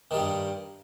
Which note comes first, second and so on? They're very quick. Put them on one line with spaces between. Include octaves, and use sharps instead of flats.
D#3 G3 G2